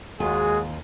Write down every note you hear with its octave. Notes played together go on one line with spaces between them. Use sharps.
D#2 G#3 F4 F#4 G#4 G#5